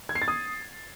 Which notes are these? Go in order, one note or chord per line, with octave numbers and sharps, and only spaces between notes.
G#6
C7
A6
D#6